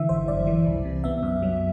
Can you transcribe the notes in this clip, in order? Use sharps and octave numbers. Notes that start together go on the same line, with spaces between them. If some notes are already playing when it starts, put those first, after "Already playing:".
Already playing: D3 E3 E5
G1 C5
F#2 D5
E3
C2
C3
B3 E5
F#2
F#3